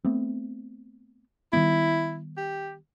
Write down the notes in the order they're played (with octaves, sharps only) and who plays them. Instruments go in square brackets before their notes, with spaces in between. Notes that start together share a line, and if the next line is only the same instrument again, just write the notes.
[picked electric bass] A3 B3 C4
[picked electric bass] D#3 G3 B3 [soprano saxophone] E4
[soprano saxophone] G4